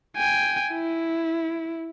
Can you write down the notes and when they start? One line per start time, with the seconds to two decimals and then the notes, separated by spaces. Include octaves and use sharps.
0.17 G5 G#5
0.72 E4